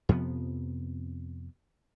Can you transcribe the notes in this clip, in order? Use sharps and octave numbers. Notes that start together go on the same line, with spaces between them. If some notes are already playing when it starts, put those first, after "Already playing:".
F2 C3 F3 B3